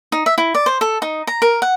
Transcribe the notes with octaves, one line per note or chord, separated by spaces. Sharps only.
D#4
E5
E4
D5
C5
A4
D#4
A#5
A#4
F#5